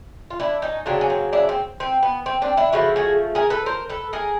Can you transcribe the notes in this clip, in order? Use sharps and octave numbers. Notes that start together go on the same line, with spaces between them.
F4
D4 E4
C#4 D#4
C#3 F#3 A#3 C4 D4
C#4
C4
D4 E4
C4
C4
B3
C4
C4 D4
D4 E4
C#3 F3 A3 E4 F#4
F#4 G#4
G#4 A#4
A4 B4
A#4 C5
A4 B4
G#4 A#4